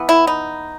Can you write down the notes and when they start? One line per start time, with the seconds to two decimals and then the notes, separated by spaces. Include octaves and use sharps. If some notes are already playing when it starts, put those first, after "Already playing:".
Already playing: E3 B3
0.09 E4
0.27 D#4